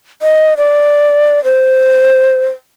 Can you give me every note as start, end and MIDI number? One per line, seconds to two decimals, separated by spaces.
0.22 0.54 75
0.57 1.43 74
1.44 2.45 72